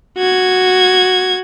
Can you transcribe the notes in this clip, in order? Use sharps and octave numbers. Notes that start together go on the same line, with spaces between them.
F#4 G#6